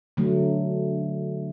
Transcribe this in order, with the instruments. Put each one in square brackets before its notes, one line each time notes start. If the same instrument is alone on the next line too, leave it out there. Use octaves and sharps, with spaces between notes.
[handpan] D3 F#3 A3